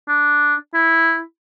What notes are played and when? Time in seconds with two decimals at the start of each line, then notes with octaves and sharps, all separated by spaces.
0.08 D4
0.74 E4